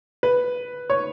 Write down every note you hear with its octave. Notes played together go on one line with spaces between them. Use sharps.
B4
C#5